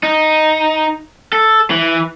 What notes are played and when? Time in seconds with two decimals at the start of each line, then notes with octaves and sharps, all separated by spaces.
0.03 D#4
1.33 A4
1.71 E3